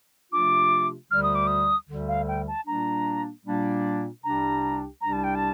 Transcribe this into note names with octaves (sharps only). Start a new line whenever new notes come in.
C3 F3 A3 D4 F4 D6
D2 D3 G3 F6
D#6
D6
D#6
D2 D3 G3
F5
G5
A5
A#2 G3 A#3 D4 A#5
A#2 G3 A#3 D4
C2 C3 G3 D4 G4 A#5
C2 C3 G3 D4 G4 A#5
A5
G5
A5